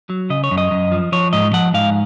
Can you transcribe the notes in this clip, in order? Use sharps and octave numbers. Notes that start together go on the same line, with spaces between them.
F#3
C#3 D#5
C#5
F#2
D#5
F#2
F3
F3 C#5
G#2 D#5
F3 F#5
G#2 F5